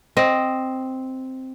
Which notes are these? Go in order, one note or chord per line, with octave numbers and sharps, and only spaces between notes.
C4 D#5